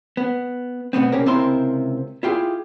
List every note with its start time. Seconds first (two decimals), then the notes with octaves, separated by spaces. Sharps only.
0.17 B3
0.93 B2 A3 B3 C4
1.12 C3 A#3 C#4 G4 A#4
1.26 C#2 C3 C4 E4 A#4 C6
2.23 E4 F4 G4 G#4